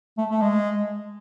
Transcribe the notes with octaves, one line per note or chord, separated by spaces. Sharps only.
A3
A3
G#3